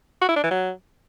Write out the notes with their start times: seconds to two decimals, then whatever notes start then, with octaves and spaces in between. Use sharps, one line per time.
0.21 F#4
0.29 E4
0.36 D4
0.43 E3
0.51 F#3